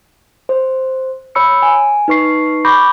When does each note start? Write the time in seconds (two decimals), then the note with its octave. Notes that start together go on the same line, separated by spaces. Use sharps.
0.49 C5
1.35 C#5 B5 E6 C#7
1.62 G#5
2.08 D#4 B4 C#6 C7
2.65 B5 C#6 D6 G6 A#6